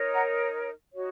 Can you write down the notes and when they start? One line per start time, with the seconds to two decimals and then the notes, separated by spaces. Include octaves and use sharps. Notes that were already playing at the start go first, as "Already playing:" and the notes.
Already playing: D#4 A#4 C#5
0.13 F#5 A#5
0.93 D#4 F#4 C#5